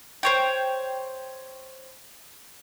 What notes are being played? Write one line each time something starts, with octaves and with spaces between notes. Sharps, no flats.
C5 C#5 G5